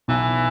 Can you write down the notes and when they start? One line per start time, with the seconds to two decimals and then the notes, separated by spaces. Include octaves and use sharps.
0.08 B1 E3